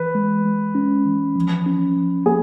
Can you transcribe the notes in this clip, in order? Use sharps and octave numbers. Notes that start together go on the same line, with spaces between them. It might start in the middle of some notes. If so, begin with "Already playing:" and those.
Already playing: E3 B4
G#3
G#3
C#4
E3
F3
C#4
F3
A#3 G#4